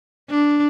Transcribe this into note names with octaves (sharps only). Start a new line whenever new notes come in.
D4